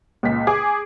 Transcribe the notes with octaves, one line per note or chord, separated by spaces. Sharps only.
C#2 A#2 B6
G#4 D6